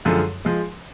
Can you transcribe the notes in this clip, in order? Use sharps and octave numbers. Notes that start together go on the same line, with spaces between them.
F#2 D3 F3 G#3
F3 G#3